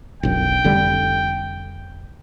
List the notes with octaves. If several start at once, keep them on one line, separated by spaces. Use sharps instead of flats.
E1 B1 F#2 G5
F1 D3 G3